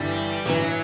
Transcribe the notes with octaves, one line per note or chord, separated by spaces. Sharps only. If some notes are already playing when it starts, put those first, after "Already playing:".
Already playing: G1 G2 E3 G3
A1 G2 E3 F#3